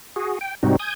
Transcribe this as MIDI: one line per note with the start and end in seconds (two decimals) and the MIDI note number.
0.16 0.39 66
0.16 0.39 68
0.41 0.55 79
0.63 0.76 44
0.63 0.76 48
0.63 0.76 55
0.63 0.76 60
0.63 0.76 63
0.63 0.76 66
0.79 0.94 80
0.79 0.94 87
0.79 0.94 91
0.79 0.94 92